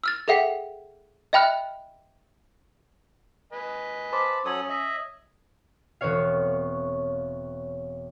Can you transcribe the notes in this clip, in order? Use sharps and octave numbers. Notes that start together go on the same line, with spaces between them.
E6 F6 A6
G#4 A4 E5 F#5 G5 B6
D#5 E5 G5 B5 F6 F#6
B4 D#5 G#5
C5 A5 B5 C6 D6
F#3 C#4 A4 C#5 D#6 G#6 F#7
D#5 E5
E1 B3 C4 C#5 F5